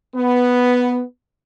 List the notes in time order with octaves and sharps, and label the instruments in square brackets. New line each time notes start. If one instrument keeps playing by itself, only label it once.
[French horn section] B3